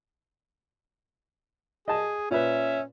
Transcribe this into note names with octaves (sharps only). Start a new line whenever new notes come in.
G#4 D#5 A5
A#2 C#4 B4 E5